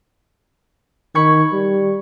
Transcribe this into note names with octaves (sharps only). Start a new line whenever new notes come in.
D#3 B5 C#6 G#6
G3